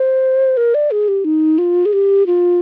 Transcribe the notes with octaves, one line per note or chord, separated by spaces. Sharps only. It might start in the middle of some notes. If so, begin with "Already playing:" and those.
Already playing: C5
A#4
D5
G#4
G4
D#4
F4
G#4
G4
F4